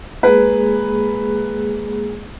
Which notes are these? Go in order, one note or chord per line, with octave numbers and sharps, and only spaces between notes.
G#3 A#3 G#4 B4